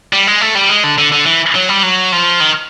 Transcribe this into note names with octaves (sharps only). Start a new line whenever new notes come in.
G3
G#3
A3
G3
G#3
D3
D3
D3
E3
F#3
G3
F#3
F3
D#3